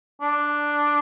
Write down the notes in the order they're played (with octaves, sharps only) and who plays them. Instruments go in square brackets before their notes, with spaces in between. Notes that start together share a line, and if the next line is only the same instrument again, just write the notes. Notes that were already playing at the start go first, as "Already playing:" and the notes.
[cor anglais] D4